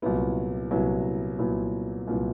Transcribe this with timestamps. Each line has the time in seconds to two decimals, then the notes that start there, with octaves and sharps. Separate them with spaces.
0.02 C2 A#2 F#3 B3 E4
0.71 C2 A#2 F#3 B3 E4
1.39 C2 A#2 F#3 B3 E4
2.07 C2 A#2 F#3 B3 E4